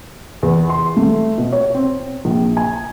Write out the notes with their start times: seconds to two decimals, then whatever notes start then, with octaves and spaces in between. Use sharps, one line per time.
0.43 E2
0.70 C6
0.97 A3
1.38 B2
1.52 C#5
1.74 C4
2.25 A#1
2.57 G#5